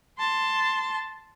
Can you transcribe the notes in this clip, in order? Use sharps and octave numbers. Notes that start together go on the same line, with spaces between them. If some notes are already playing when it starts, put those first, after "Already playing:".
A5 C6